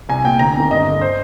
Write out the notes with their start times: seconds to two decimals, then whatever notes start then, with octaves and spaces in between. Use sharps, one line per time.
0.09 C2 G#5
0.24 A#2 G5
0.39 D2 A#5
0.56 C3 D#3
0.70 G2 D#5
0.87 D3
1.01 C5